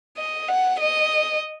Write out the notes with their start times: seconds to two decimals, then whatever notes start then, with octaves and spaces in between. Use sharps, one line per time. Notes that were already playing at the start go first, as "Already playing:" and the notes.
0.17 D#5
0.48 F#5
0.80 D#5